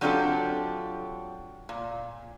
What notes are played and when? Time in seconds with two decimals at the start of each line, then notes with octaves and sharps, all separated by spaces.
0.01 F#3 C4 D4 F4 G4 A4
1.69 A#2